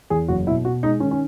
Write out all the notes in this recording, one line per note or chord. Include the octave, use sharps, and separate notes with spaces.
E2 G#4
F#1 F#4
B2 E4
B2 F#4
G#3 D#4
D#3 C#4
C#4